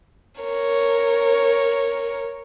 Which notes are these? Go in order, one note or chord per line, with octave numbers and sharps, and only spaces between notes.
A#4 C#5